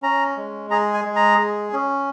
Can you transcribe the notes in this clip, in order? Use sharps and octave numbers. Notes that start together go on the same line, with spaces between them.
C#4 A#5
G#3
G#4 A#5
G#5
G#3
A#5
G#4
C#4